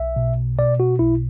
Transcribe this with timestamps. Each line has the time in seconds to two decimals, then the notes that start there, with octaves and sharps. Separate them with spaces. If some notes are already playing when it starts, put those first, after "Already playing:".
Already playing: B1 E5
0.16 B2
0.59 B2 D5
0.80 F#4
0.99 B1 E4